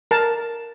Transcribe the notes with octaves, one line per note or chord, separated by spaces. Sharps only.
A#4 A5